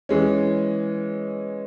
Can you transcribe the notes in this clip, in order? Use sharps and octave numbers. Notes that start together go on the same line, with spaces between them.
E3 G#3 C#4